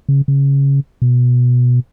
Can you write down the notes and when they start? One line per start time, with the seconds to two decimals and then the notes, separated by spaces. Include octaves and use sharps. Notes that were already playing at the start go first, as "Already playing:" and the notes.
0.09 C#3
0.28 C#3
1.02 B2